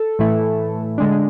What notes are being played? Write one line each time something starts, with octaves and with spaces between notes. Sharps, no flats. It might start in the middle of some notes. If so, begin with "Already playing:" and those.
Already playing: A4
A2 E3 A3 E4
D3 G#3 D4